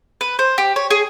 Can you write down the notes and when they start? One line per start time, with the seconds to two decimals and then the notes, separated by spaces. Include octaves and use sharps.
0.21 B4
0.39 C5
0.58 G4
0.76 C#5
0.90 G#4